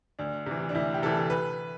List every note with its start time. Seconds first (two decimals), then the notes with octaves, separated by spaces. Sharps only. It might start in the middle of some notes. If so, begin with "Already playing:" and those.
0.19 D2 D4
0.46 C3 E3
0.69 D4
0.75 D2 E4
0.94 G4
1.02 C3 E3 A4
1.30 B4